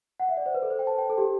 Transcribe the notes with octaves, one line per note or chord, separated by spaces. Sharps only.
F#5
E5
D5
C5
B4
A4
C5
G5
A5
G5
A4
G4